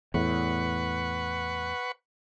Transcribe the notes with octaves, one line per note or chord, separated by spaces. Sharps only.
E2 A2 B4 F#5 C#6